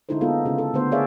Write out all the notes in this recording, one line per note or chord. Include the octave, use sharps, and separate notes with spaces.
D3 G#3 D#4 E4 A4 C5
G#3 A#3 B3 D#4 F4 A4
C#3 G#3 F4
A4
D3 A3 B3 C5
G#4 A#4 C#5 D5 E5 F5